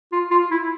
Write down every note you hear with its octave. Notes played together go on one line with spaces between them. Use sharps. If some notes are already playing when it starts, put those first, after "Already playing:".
F4
F4
E4